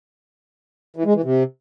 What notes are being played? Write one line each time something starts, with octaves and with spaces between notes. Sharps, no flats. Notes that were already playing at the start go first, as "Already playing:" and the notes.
E3
G#3
E3
C3